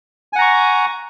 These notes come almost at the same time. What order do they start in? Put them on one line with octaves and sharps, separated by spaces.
G#5 F#5 A#5 C#6